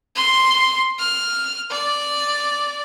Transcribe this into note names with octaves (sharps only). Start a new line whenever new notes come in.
C6
F6
D5